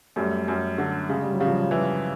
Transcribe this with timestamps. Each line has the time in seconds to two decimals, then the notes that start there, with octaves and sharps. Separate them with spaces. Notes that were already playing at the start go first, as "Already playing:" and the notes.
0.16 F#2 G3 A3
0.48 F#2
0.78 D3
1.09 C#3 G#3
1.21 G3
1.34 F#3
1.40 C#3 F3 G3
1.71 E3